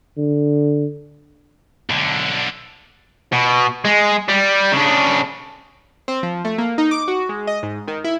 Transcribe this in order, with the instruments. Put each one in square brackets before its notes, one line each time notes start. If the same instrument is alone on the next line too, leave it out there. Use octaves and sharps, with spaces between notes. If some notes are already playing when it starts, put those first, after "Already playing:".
[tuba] D3
[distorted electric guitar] B1 D3
[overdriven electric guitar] B2
G#3
G3
C#3 D4
[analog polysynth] C4
F3
A3
A#3
D#4
D6
F#4
G#3
D#5
G#2
D#3
E4